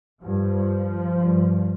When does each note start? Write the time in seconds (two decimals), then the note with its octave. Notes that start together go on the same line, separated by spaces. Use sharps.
0.23 G2 F3
1.18 G2